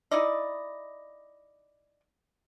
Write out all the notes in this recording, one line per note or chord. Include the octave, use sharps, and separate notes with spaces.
D#4 E4 D5 D#5